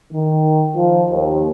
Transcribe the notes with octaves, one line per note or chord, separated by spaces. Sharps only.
D#3
F3
D#2